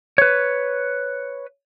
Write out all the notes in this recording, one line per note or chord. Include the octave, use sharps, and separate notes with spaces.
B4 C#5